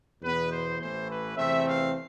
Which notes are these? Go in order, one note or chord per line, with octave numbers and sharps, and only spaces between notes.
E2 B2 B3 B4
C5
A1 A2 E3 A3 C5
B4
E2 C3 E3 A3 C4 E5
F5